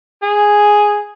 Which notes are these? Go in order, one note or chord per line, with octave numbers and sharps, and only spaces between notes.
G#4